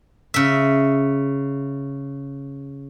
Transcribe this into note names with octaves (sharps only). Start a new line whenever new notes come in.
C#3 E5